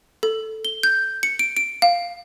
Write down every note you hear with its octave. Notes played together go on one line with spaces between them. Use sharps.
A4
G7
G6
C#7
D7
D7
F5